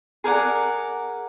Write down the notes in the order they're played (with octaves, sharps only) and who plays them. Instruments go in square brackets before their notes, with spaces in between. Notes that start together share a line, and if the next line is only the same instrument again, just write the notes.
[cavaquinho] G#4 A#4 D5 F#5